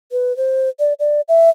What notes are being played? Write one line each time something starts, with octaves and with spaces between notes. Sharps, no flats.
B4
C5
D5
D5
E5